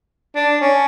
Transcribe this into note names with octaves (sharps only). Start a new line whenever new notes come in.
D4
C#4